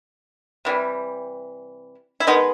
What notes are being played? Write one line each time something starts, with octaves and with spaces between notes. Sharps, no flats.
C3 E3 G3
E4
D#3 G#3 B3 D#4